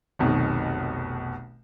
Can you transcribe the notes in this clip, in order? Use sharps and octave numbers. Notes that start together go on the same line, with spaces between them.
F1 B1 B2 D#3